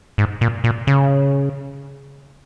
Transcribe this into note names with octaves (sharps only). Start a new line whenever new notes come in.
G#2
A#2
A#2
C#3